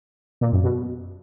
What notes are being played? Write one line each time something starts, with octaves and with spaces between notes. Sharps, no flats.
A#2
F#2
B2